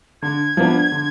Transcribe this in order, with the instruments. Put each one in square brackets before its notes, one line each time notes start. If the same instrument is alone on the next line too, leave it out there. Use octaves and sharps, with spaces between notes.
[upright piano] D3 [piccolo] G#6
[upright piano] F3 B3 D4
D3